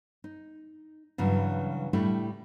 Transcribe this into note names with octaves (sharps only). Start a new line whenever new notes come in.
D#4
G2 C#3 E3 F#3
A2 G3 A3 D4 E4